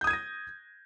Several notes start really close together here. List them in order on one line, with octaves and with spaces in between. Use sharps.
G6 D#6 G#6 D#7 A#6